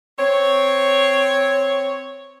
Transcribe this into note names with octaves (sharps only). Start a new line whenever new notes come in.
C4 C#5